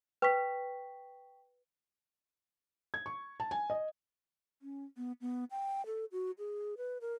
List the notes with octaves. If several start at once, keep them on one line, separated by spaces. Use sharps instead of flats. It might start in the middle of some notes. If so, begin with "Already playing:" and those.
B4 G5 C#6 B6
G#6
C#6
A5
G#5
D#5
C#4
B3
B3
G5
A4
F#4
G#4
B4
A#4